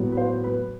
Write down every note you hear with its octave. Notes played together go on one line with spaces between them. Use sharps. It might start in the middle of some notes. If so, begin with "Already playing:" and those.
Already playing: A2 F#3 B3
B4
C5
B4